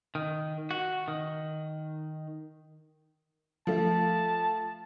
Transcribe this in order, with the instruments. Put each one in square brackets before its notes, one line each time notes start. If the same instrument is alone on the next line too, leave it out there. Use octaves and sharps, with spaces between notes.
[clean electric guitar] D#3
F#4
D#3
[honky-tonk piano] F3 A3 [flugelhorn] A5